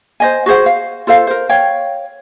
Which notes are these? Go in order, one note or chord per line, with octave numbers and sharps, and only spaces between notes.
C5 D#5 G#5
F#4 G#4 C5 F#5
F5
F4 A4 C5 F5
A#4 C5
C#5 F5 G5